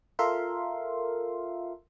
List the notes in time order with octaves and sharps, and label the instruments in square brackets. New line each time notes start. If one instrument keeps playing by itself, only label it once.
[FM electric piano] F4 A4 A#4 E5 F5 C6